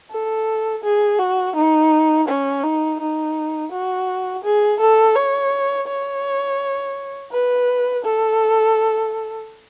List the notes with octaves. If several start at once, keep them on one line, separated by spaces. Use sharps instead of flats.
A4
G#4
F#4
D#4
C#4
D#4
D#4
F#4
G#4
A4
C#5
C#5
B4
A4